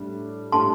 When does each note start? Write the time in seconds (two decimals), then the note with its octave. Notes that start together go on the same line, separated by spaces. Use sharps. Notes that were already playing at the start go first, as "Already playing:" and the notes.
Already playing: A2 G3 D4
0.52 A2 G3 D4 A4 A5 C6